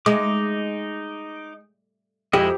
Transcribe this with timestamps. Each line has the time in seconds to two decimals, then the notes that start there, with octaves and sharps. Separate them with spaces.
0.06 G#3 D#4 D6
2.33 F2 G#3 E4 G4 D#5